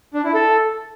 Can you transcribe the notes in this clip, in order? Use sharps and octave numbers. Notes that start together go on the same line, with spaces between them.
D4
E4
A4